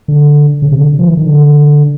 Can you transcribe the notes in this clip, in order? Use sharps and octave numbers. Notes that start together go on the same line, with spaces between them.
D3
C#3
C3
D3
F3
E3
D#3
D3